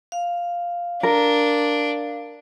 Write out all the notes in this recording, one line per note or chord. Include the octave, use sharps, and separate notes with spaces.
F5
D4 A#4